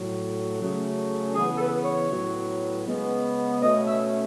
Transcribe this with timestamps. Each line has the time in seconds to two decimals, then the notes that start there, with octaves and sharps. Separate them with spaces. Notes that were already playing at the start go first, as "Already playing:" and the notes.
Already playing: A2 F#3 A3
0.59 C#3 F#3 A3 C#4
1.34 C#3 E3 B3 G#4
1.55 A4
1.59 B4
1.85 C#5
2.10 A2 F#3 B3
2.85 C#3 G#3 B3
3.60 B2 A3 C#4 D#5
3.86 E5